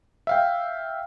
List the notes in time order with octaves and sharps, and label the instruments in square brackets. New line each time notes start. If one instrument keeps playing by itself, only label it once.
[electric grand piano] E5 F5 G5